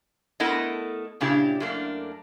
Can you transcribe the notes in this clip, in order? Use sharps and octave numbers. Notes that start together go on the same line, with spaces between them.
A3 B3 E4 A4 A#4 D#5
A#2 C#3 D4 E4 G4
F#2 A3 A#3 D4